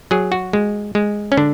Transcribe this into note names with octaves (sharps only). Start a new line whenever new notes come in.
F#3 G#4
F#4
G#3
G#3
C#4
D3 D4